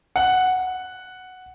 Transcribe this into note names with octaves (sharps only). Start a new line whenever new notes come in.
F#5